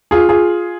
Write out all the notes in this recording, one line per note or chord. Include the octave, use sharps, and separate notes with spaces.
F4 G#4
F4 G#4